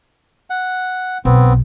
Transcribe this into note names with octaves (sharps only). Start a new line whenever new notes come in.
F#5
B1 B3 C4